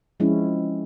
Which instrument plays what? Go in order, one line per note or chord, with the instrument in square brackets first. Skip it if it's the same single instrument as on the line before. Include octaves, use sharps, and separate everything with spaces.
[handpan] F3 G#3 C4 C#4 E4